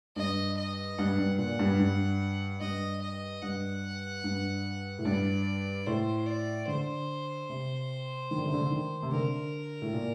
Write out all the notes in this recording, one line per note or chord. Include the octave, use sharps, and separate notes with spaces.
G2 D#5
D#5
G2 F#5
G2
A#2 F#5
G2
G2
G2 D#5
D#5
G2 F#5
G2
A2
G2 D5
A2 C5
D5
D3 C5
C3
D#3
D3
C3
D3
D#3
C3
D3 A#4
A2
A#2